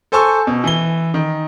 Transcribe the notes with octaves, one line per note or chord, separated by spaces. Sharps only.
A4 C5 G#5 A5 C#6 E6
B2
E3 G7
D#3